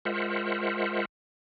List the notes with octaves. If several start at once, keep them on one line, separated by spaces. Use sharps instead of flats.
G#3 F4 A#4 C5 E5 F#5